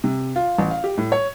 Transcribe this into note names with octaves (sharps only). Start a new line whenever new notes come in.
C3
F4
A1
F5
G4
A2
C#5